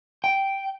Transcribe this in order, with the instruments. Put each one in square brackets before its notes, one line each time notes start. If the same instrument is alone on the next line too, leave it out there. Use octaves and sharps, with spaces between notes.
[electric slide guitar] G5